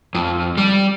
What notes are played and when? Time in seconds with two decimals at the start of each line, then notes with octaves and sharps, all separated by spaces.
0.15 F2
0.58 G3